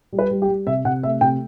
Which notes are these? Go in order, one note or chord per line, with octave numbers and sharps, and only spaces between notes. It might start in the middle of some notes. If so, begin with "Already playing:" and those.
G3
B4
G3
G4
G3
C3 E5
C3 F#5
A3 E5
C3 G5